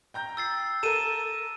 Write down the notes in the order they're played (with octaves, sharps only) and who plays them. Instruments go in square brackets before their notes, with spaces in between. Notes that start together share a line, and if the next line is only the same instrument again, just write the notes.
[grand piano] G5 A#5 G6
[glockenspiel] E6 A6 C7
[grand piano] A4 A#4 [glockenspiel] D#7 E7